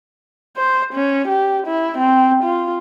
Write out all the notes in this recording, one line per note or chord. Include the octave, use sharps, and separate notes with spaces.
C5
C#4
G4
E4
C4
F4